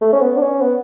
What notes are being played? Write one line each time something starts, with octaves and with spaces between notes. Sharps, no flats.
A3
C#4
B3
D4
C#4
B3